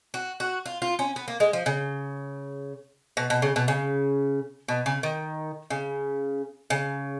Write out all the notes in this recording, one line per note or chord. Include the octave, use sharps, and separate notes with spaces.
F#4
F#4
F4
F4
C#4
B3
A#3
G#3
F3
C#3
B2
B2
C#3
B2
C#3
B2
C#3
D#3
C#3
C#3